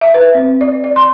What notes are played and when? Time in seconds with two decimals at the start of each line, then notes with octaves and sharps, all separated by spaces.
0.01 E5
0.14 B4
0.35 C4
0.61 D5
0.84 D5
0.96 C6